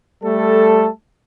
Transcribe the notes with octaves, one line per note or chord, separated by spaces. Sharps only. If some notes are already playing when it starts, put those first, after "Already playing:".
G3 A3 A4